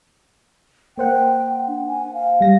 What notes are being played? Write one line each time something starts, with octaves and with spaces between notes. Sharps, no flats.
A#3 C5 F#5 G5
D4
G#5
F5
G3 A#6